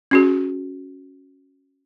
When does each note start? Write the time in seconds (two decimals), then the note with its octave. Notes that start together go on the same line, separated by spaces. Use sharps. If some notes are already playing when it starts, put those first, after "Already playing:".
0.11 C#4 F#4 G#4